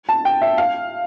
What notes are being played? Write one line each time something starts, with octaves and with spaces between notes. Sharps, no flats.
A5
G5
E5
F5